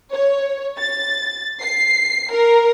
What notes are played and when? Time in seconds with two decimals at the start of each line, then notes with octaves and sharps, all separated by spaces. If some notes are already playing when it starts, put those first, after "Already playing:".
0.12 C#5
0.78 A6
1.62 C7
2.31 A#4